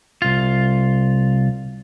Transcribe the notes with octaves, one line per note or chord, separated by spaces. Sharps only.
C2 F4